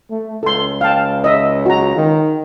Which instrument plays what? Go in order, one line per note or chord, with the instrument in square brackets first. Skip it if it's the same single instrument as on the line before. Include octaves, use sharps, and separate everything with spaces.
[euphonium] A3
[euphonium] C#2 [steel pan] A4 C6
[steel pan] F5 G5 A5
D#5 E5
F#4 A#5
[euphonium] D#3